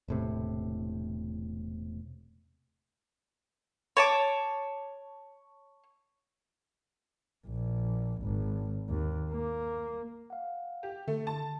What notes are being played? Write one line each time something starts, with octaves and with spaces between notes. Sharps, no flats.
E1 A2 C3
C#5 A5 D6
A#1
G#1
D#2
A#3
F5 F#5
G4
D3 A3
A5